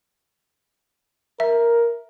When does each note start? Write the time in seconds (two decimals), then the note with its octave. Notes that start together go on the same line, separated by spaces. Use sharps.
1.40 A#4 E5